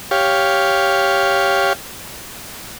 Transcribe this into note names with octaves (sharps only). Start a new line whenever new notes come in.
G4 C#5 F5